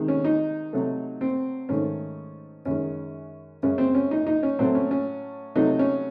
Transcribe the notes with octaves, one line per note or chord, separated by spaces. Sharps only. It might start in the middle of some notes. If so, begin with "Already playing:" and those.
Already playing: C3 D#3 G#3
C#4
D#4
C3 F#3 A3
C4
G#2 D#3 A3 C#4
F#2 D#3 G#3 C#4
F#2 C#3 G#3 C#4
C4
C#4
D#4
D#4
C#4
A2 F#3 A3 C4
C#4
C#4
C3 F#3 A3 D#4
C#4